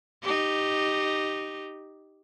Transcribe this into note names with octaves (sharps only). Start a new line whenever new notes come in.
D#4 G4